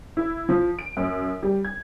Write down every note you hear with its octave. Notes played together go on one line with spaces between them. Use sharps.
E4
F3
D7
F#2
G3
G#6